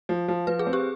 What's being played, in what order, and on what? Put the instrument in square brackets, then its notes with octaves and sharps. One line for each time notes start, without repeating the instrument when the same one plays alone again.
[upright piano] F3
F3
[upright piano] F3 [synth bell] B4
[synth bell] G#4
[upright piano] C4
[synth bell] G4